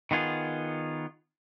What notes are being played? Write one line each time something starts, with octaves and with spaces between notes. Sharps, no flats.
D#3 B3 F4 G#4